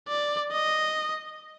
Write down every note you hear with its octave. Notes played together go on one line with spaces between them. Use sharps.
D5
D#5